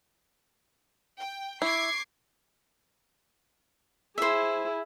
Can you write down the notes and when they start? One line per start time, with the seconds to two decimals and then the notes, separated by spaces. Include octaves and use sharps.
1.18 G5
1.62 E4 C#6 D6 G#6 C7
4.18 E4 G#4 C5 E5